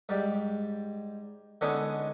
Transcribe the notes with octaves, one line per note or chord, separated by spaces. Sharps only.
G#2 G3
D3 G#3 B3 C#4 D#4